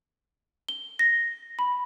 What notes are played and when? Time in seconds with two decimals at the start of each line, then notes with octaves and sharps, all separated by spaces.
0.68 G7
0.99 A#6
1.59 B5